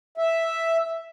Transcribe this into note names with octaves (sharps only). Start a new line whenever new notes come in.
E5